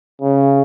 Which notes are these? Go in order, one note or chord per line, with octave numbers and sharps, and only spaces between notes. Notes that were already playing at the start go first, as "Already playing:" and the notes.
C#3